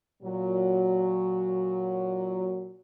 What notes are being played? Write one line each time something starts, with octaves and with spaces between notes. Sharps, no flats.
A#2 F#3